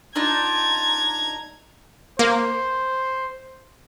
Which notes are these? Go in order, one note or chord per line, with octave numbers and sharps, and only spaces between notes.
D4 D#4 F4 A#5 G#6
A#3 C5